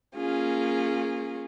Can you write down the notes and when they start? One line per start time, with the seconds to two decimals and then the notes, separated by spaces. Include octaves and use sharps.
0.15 A#3 C#4 F4 G#4